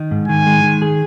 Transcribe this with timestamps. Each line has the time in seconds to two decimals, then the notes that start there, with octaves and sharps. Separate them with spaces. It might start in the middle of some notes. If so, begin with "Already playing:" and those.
Already playing: D#3
0.11 G#2
0.28 D#3 G#5
0.46 G#3
0.63 D#3
0.82 G#4